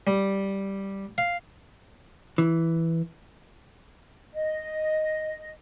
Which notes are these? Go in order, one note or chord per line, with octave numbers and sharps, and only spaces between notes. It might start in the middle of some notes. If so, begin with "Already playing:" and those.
G3
F5
E3
D#5